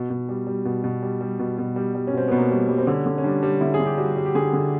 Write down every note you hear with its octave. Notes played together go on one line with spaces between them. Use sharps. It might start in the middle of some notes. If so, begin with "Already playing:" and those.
Already playing: B2
B2
G3
G3
B2
B2
G3
G3
B2
B2
G3
G3
C#4
B2 C4
B2 B3
A#3
G3
G3
C4
D3 C#4
D3
C#4
G3 D4
G3
D3 E4
G#4
D3
G4
G3 F#4
G3
G4
D3 G#4
D3